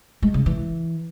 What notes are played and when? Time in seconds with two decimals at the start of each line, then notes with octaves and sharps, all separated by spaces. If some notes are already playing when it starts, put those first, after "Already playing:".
0.22 G#3
0.34 C#3
0.46 E3